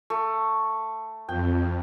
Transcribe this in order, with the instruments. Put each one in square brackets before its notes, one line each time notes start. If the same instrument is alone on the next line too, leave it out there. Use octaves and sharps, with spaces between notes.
[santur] A3
[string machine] F2 [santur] G5